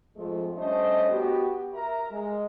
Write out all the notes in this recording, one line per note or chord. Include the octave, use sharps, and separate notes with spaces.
F2 G#2 F3 G#3 A3
G3 A3 C#4 D4 C5 D#5
B3 F#4 G4
A#4 E5 A#5
G#3